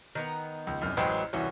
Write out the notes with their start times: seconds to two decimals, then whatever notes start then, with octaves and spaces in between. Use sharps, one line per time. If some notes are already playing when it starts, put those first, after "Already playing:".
0.15 D#3 B3 A#5
0.67 C#2
0.81 C2 F#2 F6
0.97 A1 F#3 G#3 B4 C5 G5
1.33 C2 E3 C#4 F#4